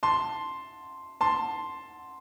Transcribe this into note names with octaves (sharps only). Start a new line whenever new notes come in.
A5 C6
A5 C6